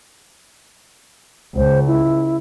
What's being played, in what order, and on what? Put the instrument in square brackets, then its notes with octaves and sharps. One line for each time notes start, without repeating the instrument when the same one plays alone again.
[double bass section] C#2 [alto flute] C5
[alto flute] E4